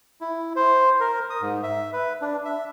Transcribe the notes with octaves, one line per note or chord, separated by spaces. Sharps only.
E4
C5
A#4
D#6
G#2
E5
B4
D4
E5